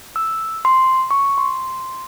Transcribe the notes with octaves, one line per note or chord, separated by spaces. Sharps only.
E6
C6
C#6
C6